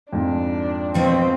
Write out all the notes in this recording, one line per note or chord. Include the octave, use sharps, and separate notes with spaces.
F2 G#2 D4
B2 F3 C4 G5